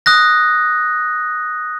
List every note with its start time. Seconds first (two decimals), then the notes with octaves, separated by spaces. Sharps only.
0.06 D#6 F#6 A#6